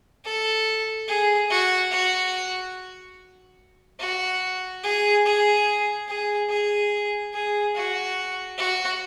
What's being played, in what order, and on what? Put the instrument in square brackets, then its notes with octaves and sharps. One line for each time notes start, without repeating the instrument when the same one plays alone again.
[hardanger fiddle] A4
G#4
F#4
F#4
F#4
G#4
G#4
G#4
G#4
G#4
F#4
F#4